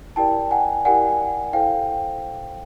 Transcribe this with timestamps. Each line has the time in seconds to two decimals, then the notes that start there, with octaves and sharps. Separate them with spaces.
0.16 E4 G4 A#4 D5 G5 A5
0.51 F#5 G#5
0.85 E4 G4 A#4 D5 F#5 G#5
1.53 E4 A4 C5 F5 G5